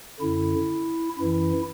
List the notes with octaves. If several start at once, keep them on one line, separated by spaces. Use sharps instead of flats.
F#2 D3 E4
F#2 E3 E4